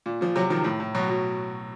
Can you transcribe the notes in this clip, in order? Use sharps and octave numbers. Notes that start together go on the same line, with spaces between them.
A#2
A#2 F3
C3 F#3
D#3 F3
A2
A2
B2 F#3
B2